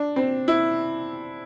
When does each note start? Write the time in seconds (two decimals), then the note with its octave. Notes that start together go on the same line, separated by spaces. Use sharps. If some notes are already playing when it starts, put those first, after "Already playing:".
Already playing: D4
0.16 C4
0.48 E4